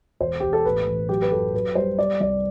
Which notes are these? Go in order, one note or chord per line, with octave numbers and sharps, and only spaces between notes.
E1 C5
E1 G4
A4
A1 B4
A1
F#3 G4
B4
F#2 A4
F#2 B4
G3 C5
G3 D5
C2 D5